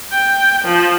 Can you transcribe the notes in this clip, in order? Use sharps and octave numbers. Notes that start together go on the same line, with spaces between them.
G5
F3